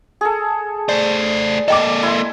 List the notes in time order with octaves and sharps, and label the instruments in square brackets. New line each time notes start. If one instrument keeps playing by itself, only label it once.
[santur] G#4 A4
[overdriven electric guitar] A3 C5 [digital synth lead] D5
[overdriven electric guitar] A#3 A4 [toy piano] D#5 G5 D6
[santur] E4 C6